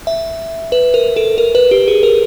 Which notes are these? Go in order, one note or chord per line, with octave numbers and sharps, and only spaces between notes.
E5
B4
A#4
A4
A#4
B4
G4
G#4
A#4